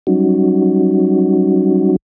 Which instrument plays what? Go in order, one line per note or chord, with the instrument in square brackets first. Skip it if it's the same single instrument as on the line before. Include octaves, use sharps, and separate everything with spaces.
[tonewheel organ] F#3 G3 C#4 D#4 F#4